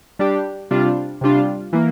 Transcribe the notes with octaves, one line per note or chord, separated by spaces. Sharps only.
G3 D4 G4
C3 G3 D4 F4
C3 G3 D4 F4
E3 A#3